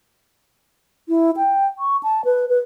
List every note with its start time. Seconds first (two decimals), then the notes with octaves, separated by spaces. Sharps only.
1.09 E4
1.37 G5
1.79 C#6
2.03 A5
2.25 B4
2.49 B4